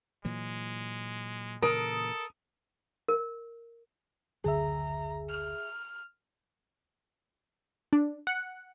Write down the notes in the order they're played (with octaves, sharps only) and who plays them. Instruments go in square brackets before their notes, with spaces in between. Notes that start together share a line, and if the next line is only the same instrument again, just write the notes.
[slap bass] A#2 E3 F#3 [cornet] G#3
[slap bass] A#2 C#3 E3 [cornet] A4 [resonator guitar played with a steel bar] A#4 [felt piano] D#6
[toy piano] A#4
[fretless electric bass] F#1 D2 D3 [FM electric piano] G#4 E5 [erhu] A#5
[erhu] F6
[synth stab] D4
F#5